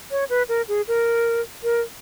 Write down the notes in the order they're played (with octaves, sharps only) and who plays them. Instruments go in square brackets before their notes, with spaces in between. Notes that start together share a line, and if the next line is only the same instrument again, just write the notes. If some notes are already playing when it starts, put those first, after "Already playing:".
[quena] C#5
B4
A#4
G#4
A#4
A#4